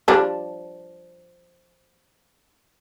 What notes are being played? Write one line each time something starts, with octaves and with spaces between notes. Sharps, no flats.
F3 G3 D4